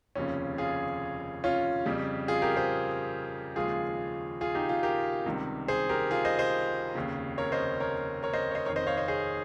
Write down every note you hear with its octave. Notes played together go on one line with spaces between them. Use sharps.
F1 D#2 C#3 F3 C#4
F4 G#4
C#4 F4
F2 C#3 G3
F4 G#4
G4 A#4
G#4 C5
D#2 C#3 F3 G#3 F4 G#4
F4 G#4
D#4 G4
F4 G#4
G4 A#4
C#2 C3 D#3 G3
G#4 C5
G4 A#4
F4 G#4
C5 D#5
C5 D#5
F1 D#2 C#3
A#4 C#5
C5 D#5
A#4 C#5
A#4 C#5
C5 D#5
C#5
C5 D#5
F1 F2 D#3 A#4 C#5
C5 D#5
C#5 F5
C5 D#5
G#4 C5